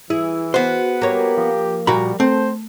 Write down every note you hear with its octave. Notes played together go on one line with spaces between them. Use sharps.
E3 E4 G#4
B3 F#4 C5
A#3 G4 C#5
F3
A#2 G3 F#4 A#4 B5
A3 C4 C5